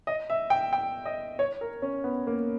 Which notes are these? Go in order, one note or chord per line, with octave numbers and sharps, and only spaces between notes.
D#5
E5
G5
G5
D#5
C#5
A#4
C#4
B3
A#3